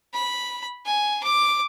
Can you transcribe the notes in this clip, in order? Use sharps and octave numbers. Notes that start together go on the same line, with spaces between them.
B5
G#5
D6